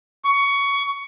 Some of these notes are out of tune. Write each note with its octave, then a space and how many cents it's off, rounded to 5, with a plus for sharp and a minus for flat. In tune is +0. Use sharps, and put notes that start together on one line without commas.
C#6 +20